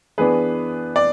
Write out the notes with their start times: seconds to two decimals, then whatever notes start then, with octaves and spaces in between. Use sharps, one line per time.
0.18 E3 B3 D4 G#4 B4
0.96 D5